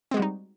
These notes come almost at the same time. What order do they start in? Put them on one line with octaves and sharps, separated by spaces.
C4 G#3 F#4 G3 D#4